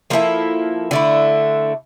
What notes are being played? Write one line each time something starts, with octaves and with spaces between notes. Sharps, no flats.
F3 A#3 E4 A4
D3 A3 E4